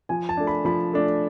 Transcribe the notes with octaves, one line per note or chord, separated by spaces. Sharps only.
F3 G#5
A5
A3 D4
B5
F3 B5
A3 D4